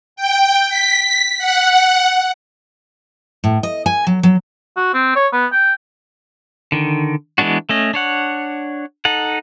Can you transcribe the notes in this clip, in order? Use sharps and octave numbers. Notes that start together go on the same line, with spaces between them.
G5
B6
F#5
A2
D#5
G#5
F#3
F#3
F#4
C4
C#5
B3
G5
D3 D#3
E3 G#3 B3 D4 F#4
A3 C#4 D#5
D4 C#5 F#5
D#4 A4 F#5